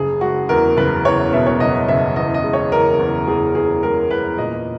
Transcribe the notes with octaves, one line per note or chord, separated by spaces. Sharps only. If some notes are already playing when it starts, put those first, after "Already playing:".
Already playing: F#1 G#4
G#3 F#4
E2 A#4
F#1 B4
E2 C#5
B2 E5
C#5
F#1 D#5
F#1 E5
E2 D#5
D#5
G#3
C#5
E2 A#4
E2
E2 G#4
E2 G#4
G#3 A#4
E2 B4
A#2 D#5